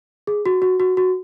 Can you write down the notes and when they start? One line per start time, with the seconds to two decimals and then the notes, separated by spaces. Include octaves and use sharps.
0.27 G#4
0.46 F#4
0.62 F#4
0.80 F#4
0.97 F#4